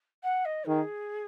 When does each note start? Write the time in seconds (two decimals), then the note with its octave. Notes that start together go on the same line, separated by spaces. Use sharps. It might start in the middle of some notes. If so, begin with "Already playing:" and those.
0.23 F#5
0.45 D#5
0.67 D#3 G#4